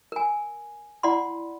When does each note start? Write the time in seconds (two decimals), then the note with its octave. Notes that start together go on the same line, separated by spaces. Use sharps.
0.12 A#4 G#5
1.03 E4 D5 F#5 B5 C6